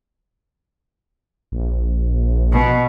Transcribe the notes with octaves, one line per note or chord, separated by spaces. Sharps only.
A#1
B2